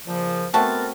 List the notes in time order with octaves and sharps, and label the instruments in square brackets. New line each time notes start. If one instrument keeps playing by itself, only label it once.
[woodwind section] A#2 C#3 F3
[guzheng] A3 C4 F#4 [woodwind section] B3 A#4 [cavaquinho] A5